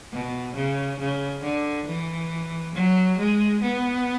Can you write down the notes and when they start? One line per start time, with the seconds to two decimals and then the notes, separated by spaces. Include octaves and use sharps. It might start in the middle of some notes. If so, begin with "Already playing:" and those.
0.12 B2
0.55 C#3
1.00 C#3
1.43 D3
1.87 E3
2.75 F#3
3.18 G#3
3.62 B3